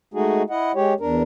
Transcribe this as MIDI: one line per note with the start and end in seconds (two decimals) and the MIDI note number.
0.14 0.43 56
0.14 0.43 57
0.14 0.43 63
0.14 0.43 66
0.14 0.43 68
0.50 0.72 64
0.50 0.72 75
0.50 0.72 78
0.75 0.94 56
0.75 0.94 67
0.75 0.94 73
1.00 1.23 40
1.00 1.23 62
1.00 1.23 70